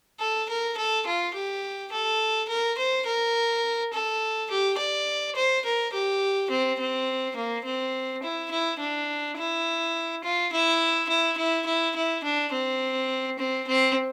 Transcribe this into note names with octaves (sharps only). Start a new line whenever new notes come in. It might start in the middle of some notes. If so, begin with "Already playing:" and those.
A4
A#4
A4
F4
G4
A4
A#4
C5
A#4
A4
G4
D5
C5
A#4
G4
C4
C4
A#3
C4
E4
E4
D4
E4
F4
E4
E4
E4
E4
E4
D4
C4
C4
C4